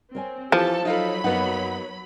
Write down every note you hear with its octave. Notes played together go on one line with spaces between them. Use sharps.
C4 A#4 C#5 G#5
E3 F3 G4 A4 A5
F#3 D#4 F4 A4 B5
F#2 A#3 B3 D#4 C#5 F#5